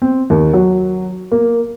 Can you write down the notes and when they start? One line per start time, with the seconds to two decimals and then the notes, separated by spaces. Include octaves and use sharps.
0.02 C4
0.30 D#2
0.53 F#3
1.32 A#3